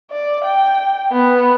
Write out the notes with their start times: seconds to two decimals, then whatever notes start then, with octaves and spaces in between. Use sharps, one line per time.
0.11 D5
0.44 G5
1.12 B3